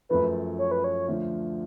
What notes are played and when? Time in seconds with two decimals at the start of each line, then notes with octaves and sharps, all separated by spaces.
0.09 F#2 F3 A3 B4
0.58 C#5
0.71 B4
0.84 C#5
1.07 D2 D3 F3